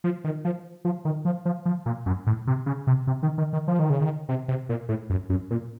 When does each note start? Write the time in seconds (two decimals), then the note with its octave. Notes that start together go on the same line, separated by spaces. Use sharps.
0.04 F3
0.24 D#3
0.45 F3
0.85 F3
1.05 D#3
1.25 F3
1.45 F3
1.66 F3
1.86 A#2
2.06 F#2
2.27 A2
2.47 C3
2.66 C#3
2.87 C3
3.07 C3
3.23 D#3
3.38 D#3
3.53 D#3
3.68 F3
3.79 D#3
3.90 C#3
4.01 D#3
4.29 C3
4.48 C3
4.69 A#2
4.89 A2
5.10 F#2
5.30 F#2
5.51 A#2